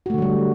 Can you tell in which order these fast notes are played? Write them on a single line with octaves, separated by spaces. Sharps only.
F#4 A3 D3 F#3 G3